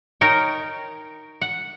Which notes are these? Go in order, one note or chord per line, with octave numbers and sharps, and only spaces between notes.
D#4 A#4 C#5 G5
F#5